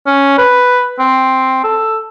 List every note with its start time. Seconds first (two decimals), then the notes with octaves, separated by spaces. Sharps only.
0.06 C#4
0.38 B4
0.99 C4
1.64 A4